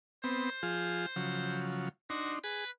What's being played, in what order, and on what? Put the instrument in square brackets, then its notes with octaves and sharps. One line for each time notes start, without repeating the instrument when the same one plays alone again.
[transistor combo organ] B3 C4 [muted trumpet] C5
[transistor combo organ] F3 F4 G#4
C#3 F3 F#3
[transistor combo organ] D4 D#4 C6 [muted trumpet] F#4
[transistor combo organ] G#4 [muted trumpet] B4